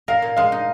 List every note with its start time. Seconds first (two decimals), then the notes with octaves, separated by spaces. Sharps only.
0.08 A#4 F5
0.22 A#2
0.37 G#3 F5
0.52 D#4